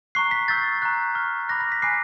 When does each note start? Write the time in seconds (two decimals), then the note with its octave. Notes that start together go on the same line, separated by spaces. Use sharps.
0.15 A#5 C#6 F#6 C7
0.31 B6
0.48 C#6 E6 G6 A6
0.82 A#5 C#6 F#6
1.15 C#6 F6
1.49 B5 D6 F#6 A#6
1.61 A#6
1.72 B6
1.82 G#5 B5 D6 F#6 C7